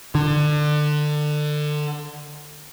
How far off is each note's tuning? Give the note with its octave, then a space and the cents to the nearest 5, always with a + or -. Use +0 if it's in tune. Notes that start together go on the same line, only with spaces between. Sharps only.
D3 +25